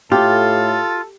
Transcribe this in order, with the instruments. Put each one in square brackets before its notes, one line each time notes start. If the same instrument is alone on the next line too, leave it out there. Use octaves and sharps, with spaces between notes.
[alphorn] A2 [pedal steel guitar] F4 [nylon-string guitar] G4 [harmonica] A4